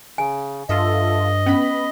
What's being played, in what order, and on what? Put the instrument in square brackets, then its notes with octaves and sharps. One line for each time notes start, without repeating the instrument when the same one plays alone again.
[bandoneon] C#3 [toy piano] G#5
[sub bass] G2 [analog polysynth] F4 A4 E5 [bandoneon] D#5
[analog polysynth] B3 B5 [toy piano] C#4